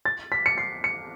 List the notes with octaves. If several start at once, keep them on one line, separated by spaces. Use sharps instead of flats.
A6
B6
C#7
C7
C#7